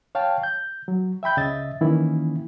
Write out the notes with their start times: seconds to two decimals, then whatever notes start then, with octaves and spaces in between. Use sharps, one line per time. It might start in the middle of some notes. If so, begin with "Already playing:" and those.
0.15 C#5 F5 G5 A5
0.43 G6
0.88 F#3
1.23 E5 G5 B5 G6
1.37 C#2 C#3 D#5 E5 A6
1.81 D#3 E3 A#3 C#4 E4